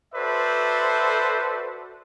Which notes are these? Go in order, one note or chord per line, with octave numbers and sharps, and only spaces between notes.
F#4 A4 B4 C5 D5 E5